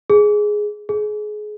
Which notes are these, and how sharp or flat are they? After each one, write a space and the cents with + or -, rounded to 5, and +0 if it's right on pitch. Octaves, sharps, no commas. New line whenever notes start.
G#4 +5
G#4 +25